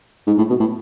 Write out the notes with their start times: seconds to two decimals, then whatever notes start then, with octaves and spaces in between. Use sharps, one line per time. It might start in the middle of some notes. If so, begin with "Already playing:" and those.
0.27 G#2
0.38 A2
0.49 B2
0.60 A2